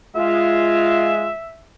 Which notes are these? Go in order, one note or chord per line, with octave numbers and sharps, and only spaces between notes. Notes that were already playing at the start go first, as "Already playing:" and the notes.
G#3 F4 E5